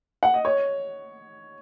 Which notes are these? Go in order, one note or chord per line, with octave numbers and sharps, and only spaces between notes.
F#5
D#5
C#5